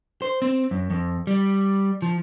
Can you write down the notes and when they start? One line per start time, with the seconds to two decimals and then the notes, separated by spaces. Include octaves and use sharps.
0.22 C5
0.42 C4
0.71 F#2
0.90 F2
1.27 G3
2.02 F3